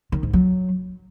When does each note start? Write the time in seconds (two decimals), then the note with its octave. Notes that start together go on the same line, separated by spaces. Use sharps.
0.12 D#3
0.23 G#2
0.33 F#3